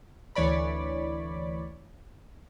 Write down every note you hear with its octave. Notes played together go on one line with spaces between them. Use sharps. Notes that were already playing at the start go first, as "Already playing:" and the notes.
D2 E3 C#5 D5 B5